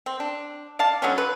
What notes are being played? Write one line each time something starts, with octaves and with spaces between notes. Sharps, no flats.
C4
D4
D5 F5 A5
D3 F#3 B3 C#4
B4